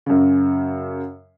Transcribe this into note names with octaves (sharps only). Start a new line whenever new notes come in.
F#2 C#3